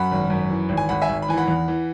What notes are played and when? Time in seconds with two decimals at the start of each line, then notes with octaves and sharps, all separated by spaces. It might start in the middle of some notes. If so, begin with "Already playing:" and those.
Already playing: F#2 F#5 B5
0.11 G#1
0.30 F#2
0.50 E3
0.69 G#1
0.77 G#5
0.89 G#1 F#5 B5
1.02 E5 G#5
1.09 G#1
1.22 B5
1.28 E3 G#5
1.37 F#5 B5
1.48 E2
1.68 E3